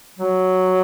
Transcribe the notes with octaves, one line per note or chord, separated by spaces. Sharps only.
F#3